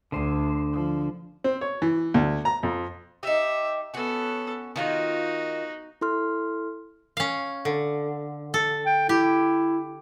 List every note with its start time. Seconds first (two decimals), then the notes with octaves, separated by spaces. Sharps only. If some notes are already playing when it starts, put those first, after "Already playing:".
0.12 D2 D3 C5
0.74 F3
1.44 C4
1.61 C#5
1.82 E3
2.14 D2
2.45 A#5
2.63 F2
3.23 D#4 G4 E5
3.94 B3 C#4 F#4 A4
4.76 D#3 D#4 F4 F#4 F5
6.01 E4 A4 C6 F6
7.17 C#4 F5
7.65 D3
8.54 A4
8.86 G5
9.09 E4 G4